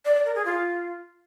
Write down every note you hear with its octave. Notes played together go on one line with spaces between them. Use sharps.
D5
D5
A#4
G#4
F4